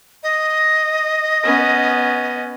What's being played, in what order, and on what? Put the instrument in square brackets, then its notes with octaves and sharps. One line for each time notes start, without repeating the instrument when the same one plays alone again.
[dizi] D#5
[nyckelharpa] B3 C#4